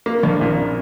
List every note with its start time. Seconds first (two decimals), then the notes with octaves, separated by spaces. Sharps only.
0.06 A#3
0.23 A#1
0.41 A#2